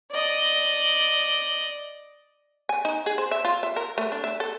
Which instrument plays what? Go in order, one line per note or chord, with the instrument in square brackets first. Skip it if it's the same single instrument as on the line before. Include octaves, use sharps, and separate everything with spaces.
[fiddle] D5 D#5
[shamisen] G#5
D#4
G#4
C5
E5
F4
E5
A#4
A3
D4
E5
A4